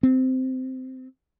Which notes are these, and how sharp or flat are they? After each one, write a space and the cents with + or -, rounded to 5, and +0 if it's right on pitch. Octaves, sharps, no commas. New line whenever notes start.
C4 -15